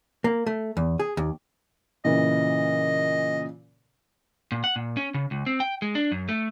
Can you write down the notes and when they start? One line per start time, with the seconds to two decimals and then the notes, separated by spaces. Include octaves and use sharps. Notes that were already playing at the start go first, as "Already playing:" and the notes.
0.24 A#3
0.46 A3
0.77 E2
0.99 G#4
1.17 D#2
2.05 A#2 C#3 E3 D#5
4.52 A#2
4.64 F#5
4.76 A#2
4.97 C#4
5.14 C#3
5.31 C#2
5.46 C4
5.60 G5
5.82 G#3
5.95 D4
6.12 F#2
6.29 A3